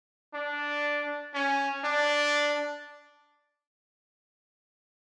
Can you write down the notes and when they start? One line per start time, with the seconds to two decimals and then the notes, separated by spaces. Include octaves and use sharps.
0.34 D4
1.34 C#4
1.84 D4